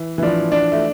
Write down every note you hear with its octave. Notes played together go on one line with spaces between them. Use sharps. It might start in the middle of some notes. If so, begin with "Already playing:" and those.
Already playing: E3
E3
F3 D4
D4
A3